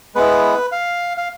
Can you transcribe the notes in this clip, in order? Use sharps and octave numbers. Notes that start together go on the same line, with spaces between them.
G#3 B3 E4 B4
F5
F5